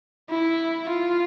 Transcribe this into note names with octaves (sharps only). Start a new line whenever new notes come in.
E4
F4